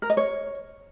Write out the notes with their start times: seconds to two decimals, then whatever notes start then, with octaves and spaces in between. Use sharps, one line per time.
0.02 A#4
0.10 D#5
0.17 C#5